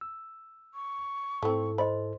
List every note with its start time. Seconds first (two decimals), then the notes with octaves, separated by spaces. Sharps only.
0.01 E6
0.74 C#6
1.43 G#2 A3 C4 E4 A4
1.78 C5 D#5 B5 C6